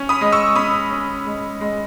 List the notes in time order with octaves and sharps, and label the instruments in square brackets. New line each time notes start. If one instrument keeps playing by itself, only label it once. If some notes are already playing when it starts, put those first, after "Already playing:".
Already playing: [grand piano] C#4
[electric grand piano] B5 D#6
[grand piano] G#3
[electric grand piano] C#6 E6
[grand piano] C#4 [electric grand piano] B5 D#6
[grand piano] C#4
G#3
G#3